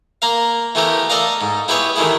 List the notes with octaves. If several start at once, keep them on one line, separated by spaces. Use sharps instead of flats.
A#3 A#4 F5
E3 A3 B3 G4 A#4
A4 A#4 D5 D#5 F5
G#2
B3 E4 G4 G#4 B4 C#5
C3 D#3 E3 A3 E4 G#4